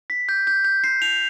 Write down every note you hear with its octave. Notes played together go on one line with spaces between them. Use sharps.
B6
G6
G6
G6
C7
F7